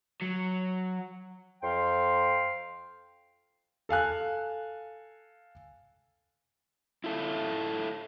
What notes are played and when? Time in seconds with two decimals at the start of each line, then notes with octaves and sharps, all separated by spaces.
0.22 F#3
1.63 F2 F5 G5 C6
3.89 A4 F5 G#5 F#6
7.04 E4 F4 A4